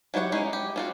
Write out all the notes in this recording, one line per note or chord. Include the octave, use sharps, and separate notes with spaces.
F#3 E4 G4 C#5 F#5
G#3 C#4 D#4 E4
G4
C4 F4 F#4